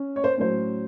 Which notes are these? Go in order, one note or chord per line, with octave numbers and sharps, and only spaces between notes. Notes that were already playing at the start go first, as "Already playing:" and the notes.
Already playing: C#4
C#5
C5
A2 F#3 C#4 C5